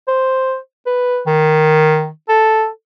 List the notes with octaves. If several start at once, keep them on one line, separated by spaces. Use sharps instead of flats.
C5
B4
D#3
A4